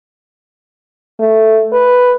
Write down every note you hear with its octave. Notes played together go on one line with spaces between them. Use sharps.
A3
B4